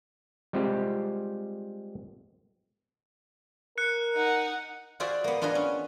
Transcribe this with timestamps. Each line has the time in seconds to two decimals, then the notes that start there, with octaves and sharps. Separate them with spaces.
0.53 G3 G#3 C4 F4 G4
3.78 A#4 F#6 C#7
4.15 D#4 F#5
5.00 F4 F#4 G#4 C5 D5 E5
5.24 A#3 B3
5.41 D4 F4 G#4 B4 D#5
5.55 C#4